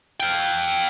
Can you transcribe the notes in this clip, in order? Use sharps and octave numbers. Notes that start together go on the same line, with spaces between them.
F5 G5